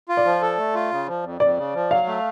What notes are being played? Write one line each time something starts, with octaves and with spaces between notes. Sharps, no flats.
F4
D5
F3
A4
A3
F4
C#3
F3
F2
F2 D5
C#3
F3
F#3 F5
A3